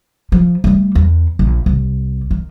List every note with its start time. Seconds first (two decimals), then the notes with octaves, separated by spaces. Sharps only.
0.32 F3
0.64 G3 A3
0.95 E2
1.39 A#1
1.66 C2
2.31 D#3